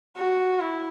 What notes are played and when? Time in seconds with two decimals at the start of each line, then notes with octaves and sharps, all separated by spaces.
0.17 F#4
0.60 E4